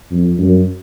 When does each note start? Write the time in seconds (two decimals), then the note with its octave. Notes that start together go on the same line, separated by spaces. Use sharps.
0.11 F2
0.38 F#2